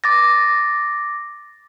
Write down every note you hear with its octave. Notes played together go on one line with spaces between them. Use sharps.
D6 A6 A#6